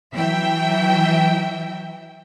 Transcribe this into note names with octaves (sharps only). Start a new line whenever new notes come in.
E3 F#3 E5 G5